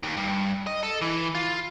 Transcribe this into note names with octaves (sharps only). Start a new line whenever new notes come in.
D#2
G2
D#5
A4
E3
F4